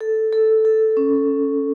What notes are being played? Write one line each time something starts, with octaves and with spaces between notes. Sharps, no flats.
A4
A4
A4
C#4